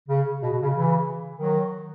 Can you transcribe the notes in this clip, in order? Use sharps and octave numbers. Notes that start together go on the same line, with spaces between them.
C#3
B2
B2
C#3
C#3 E3
D#3 F#3